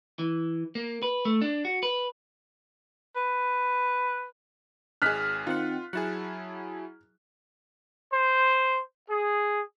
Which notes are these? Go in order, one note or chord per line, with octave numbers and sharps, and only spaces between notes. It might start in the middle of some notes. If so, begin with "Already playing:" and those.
E3
A#3
B4
A3
D4
F#4
B4
B4
G#1 G#4 F6 F#6 B6
D#3 C4 F4 F#5
F#3 E4 G#4 F#5 A5
C5
G#4